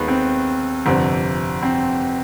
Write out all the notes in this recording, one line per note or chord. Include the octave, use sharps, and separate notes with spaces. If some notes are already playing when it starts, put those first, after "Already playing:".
Already playing: D#2 D#3 G#3 B3
C4
G1 F2 C3
C4